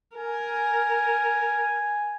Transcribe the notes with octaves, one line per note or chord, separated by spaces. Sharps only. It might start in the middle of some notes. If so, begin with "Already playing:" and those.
A#4 G#5